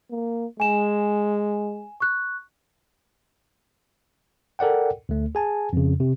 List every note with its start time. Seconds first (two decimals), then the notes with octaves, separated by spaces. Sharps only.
0.11 A#3
0.60 G#3 G#5 E7
2.00 C#6 F#6
4.59 A4 A#4 D5 F#5 G5
5.09 D2 A3
5.35 G#4 G#5 A5
5.73 F2 C#3
6.00 C3